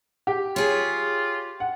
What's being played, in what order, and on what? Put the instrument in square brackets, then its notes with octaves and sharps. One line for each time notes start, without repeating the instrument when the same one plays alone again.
[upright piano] G4
[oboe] F4 [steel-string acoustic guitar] G#4 C#5
[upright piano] F#5